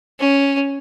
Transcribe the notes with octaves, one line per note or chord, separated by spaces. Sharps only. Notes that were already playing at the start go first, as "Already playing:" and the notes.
C#4